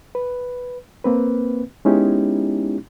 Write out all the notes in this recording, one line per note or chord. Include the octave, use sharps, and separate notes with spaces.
B4
A#3 C4 B4
G#3 B3 C#4 D#4 E4 G4